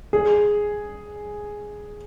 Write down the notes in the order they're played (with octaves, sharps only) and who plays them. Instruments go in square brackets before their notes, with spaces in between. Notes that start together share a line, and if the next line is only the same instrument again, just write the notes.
[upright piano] G#4